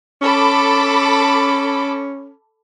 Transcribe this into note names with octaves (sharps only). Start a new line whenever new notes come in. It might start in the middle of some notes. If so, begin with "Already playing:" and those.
C#4 A4 B5 D6